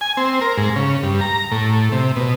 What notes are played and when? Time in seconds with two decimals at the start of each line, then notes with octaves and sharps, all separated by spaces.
0.01 G#5
0.17 C4
0.41 A#4
0.57 G#2
0.76 C#3
1.03 G2
1.21 A#5
1.52 A2
1.92 C3
2.16 B2